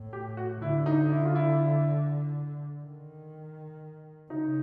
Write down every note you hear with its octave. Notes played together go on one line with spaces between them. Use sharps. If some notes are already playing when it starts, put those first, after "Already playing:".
Already playing: A2
G4
F#4
D3 E4
D#4
E4
F4
E4
D#3
C#3 D#4